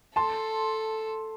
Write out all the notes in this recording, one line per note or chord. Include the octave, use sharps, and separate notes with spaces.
A4 A5 C6